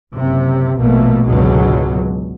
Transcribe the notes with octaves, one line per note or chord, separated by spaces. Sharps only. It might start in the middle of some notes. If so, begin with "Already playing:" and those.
F#1 C3
A#1 B2 A3 A#3
G#1 C#2 B2 D3 F#3 G#3